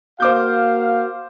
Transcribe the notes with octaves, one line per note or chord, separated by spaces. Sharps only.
A#3 F#4 C5 F5 D6 G6